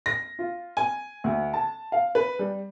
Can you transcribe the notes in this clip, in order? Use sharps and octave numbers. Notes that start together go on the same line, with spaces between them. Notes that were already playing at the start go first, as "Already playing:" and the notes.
A#6
F4
G#5
D2
A5
F5
B4
G3